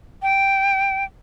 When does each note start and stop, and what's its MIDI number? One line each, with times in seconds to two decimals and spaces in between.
0.22 1.04 79